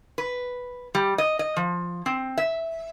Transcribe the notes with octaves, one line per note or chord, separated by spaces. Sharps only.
B4
G3
D#5
D#5
F3
C4
E5